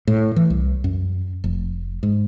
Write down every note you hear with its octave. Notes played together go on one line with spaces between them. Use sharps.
A2
E3
C2
F#2
F1
G#2